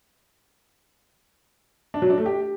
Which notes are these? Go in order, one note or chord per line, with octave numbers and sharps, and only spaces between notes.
D4
F#3
D4
A3
G4